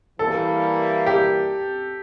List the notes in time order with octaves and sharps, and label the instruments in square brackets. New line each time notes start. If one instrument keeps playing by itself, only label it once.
[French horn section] E3 G3 A#3 [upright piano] A4
[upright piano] G4